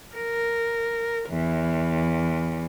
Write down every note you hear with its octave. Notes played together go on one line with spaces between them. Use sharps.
A#4
E2